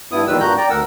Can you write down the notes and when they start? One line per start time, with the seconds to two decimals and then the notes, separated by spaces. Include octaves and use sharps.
0.12 G2 B3 E4 D#6
0.27 E2 A#2 D#3 G3 B4 E6
0.40 G2 A#2 F#4 A#5 F#6 G6
0.57 D5 G5 A#5
0.70 D2 A#4 F#5 E6